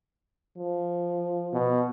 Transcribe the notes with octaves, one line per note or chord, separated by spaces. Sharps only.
F3
B2